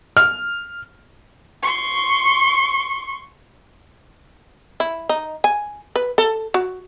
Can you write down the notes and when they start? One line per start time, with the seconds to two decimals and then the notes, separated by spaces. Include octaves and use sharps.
0.17 F6
1.63 C6 C#6
4.80 E4
5.09 D#4
5.44 G#5
5.96 B4
6.18 A4
6.54 F#4